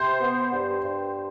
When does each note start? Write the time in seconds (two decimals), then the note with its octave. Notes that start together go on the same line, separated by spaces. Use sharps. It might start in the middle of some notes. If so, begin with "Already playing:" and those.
Already playing: C3 C5
0.21 B3
0.52 G2
0.83 G2